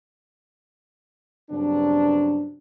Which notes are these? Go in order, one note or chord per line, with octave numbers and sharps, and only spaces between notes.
G2 C#3 F#3 B3 C4 D4